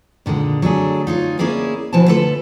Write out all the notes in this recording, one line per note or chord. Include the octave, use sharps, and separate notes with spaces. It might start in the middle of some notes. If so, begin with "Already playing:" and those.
A#2 D3 D#3 G#3
F#3 A3 D4 G#4
D#4 F4 C#5
A#3 C#4 E4 G#4 D5
D2 B2 F3 E4 G#5 A5
D3 A3 F4 A4 B4